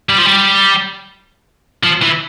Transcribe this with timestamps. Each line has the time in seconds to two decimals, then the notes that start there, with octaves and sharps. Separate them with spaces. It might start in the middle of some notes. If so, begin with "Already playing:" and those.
0.10 G3
0.18 F3
0.26 G3
1.83 F3
2.02 E3